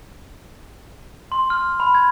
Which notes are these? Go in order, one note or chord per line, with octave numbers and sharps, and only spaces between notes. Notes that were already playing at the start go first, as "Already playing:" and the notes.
C6
F6
B5
G#6